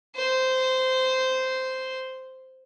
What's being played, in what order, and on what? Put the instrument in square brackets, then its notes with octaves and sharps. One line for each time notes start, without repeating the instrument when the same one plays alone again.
[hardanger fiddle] C5